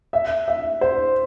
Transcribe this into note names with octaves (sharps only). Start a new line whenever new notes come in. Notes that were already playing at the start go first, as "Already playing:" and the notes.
E5
E5
C5